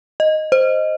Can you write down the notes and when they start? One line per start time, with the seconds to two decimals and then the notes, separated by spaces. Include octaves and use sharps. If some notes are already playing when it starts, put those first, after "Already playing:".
0.20 D#5
0.52 C5